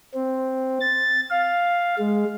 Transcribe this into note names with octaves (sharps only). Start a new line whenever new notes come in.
C4
A6
F5
G#3